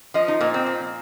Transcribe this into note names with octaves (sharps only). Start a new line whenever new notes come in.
F3 D#5
D#4
A#2 A#3
C4
A#2